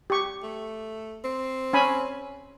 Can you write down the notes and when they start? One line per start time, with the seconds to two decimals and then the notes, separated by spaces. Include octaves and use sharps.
0.10 G4 C#6
0.43 A3
1.24 C4
1.73 C#4 G#5 B5